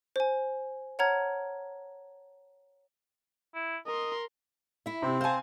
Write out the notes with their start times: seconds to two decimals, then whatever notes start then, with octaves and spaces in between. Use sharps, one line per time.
0.16 C5 G#5
0.99 C#5 F#5 A5 A#5 F6 G#6
3.54 E4
3.86 A#4 D#5 C6
4.86 E4 E5
5.02 C3 C4
5.21 C5 F5 G#5 A5